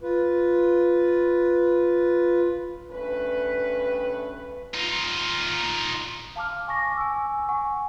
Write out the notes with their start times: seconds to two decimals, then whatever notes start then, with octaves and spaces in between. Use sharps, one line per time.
0.02 F4 B4
2.91 G2 A3 C#4 B4
4.74 D#4 F4
6.36 F5 A5 D6 F6
6.68 G#5 C#6 D6 A#6
6.97 G#5 C#6 E6
7.49 F#5 G#5 C#6